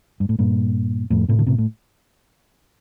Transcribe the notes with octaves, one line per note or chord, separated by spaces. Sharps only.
G2
A2
G2 A#2
F2 A2
A2 C3
D3
A2 C3
A2